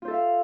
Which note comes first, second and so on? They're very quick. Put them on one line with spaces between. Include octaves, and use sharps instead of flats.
F4 C5 A4 E5 F5